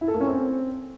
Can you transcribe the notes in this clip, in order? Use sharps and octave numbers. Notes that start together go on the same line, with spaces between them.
E4
A4
A#3
C#4
C4